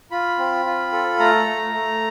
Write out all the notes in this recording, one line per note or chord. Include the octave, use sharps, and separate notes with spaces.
F4 B5
C4
F4
A4
A3 A#5
A3
A3